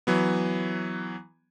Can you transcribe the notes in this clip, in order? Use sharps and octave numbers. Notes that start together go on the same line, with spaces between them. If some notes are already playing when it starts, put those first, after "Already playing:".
E3 F#3 B3